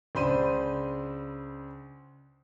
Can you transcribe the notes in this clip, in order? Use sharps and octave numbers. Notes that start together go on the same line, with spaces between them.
C#2 D4 C5 B5 C6 D#7